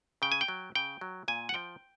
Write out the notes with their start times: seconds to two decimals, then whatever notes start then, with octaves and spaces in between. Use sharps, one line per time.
0.22 C#3 G5
0.32 G#5
0.41 G5
0.48 F#3
0.75 C#3 G5
1.01 F#3
1.28 A#2 G#5
1.49 F#5
1.54 F3 G5